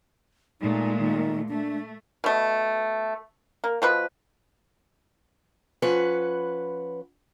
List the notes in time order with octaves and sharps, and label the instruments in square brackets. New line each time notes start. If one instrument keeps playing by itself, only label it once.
[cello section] A#2 G#3 A3 [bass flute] D#4
[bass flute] D#3
[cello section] A3 [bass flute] D4
[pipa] B2 A3
A#3
B2 F3 B4
[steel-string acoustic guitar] F3 C#4 B4 F#5